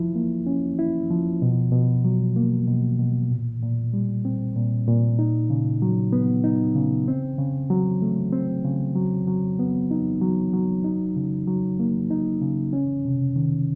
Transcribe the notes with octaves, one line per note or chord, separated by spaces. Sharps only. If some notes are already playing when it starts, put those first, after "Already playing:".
Already playing: F3 E4
A#3
C#4
E4
F3
B2
B2
F#3
A#3
B2
B2
A#2
A#2
G3
C4
A#2
A#2
D#4
C#3
F#3
B3
D#4
C#3
C4
C#3
F#3
A3
C4
C#3
F#3
F#3
B3
D#4
F#3
F#3
D#4
C#3
F#3
A#3
D#4
C#3
C#4
C3
D#3